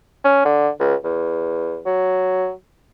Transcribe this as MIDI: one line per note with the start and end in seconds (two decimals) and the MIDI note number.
0.24 0.42 61
0.45 0.70 50
0.80 0.95 37
1.04 1.81 40
1.86 2.51 54